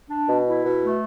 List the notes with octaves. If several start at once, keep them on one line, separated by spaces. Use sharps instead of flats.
D4
B2
E4
B2
A3